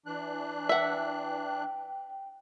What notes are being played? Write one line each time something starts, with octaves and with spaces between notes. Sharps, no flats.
E3 D4 F#6
E5 F#5 G5